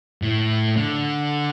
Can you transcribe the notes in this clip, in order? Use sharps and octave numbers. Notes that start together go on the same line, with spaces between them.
A2
D3